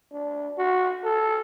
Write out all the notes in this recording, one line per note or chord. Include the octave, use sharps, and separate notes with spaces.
D4
F#4
A4